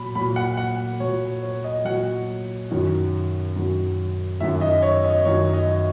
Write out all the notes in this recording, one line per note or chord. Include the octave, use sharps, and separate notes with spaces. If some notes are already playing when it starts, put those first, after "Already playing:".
Already playing: A#2 F#3 B5
A#2 F#3 B5
F#5
F#5
A#2 F#3 C#5
C#5
D#5
A#2 F#3 F#5
F#2 D#3 F#3
F#2 D#3 F#3
F#2 D#3 F#3 E5
D#5
C#5
D#5
F#2 D#3 F#3 C#5
D#5